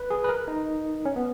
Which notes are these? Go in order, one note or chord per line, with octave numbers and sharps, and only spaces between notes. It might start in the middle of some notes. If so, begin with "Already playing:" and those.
Already playing: B4
G#4
B4
A#4
D#4
C#4
B3